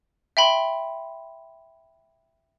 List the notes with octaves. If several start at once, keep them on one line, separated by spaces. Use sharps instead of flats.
E5 G5 B5 C6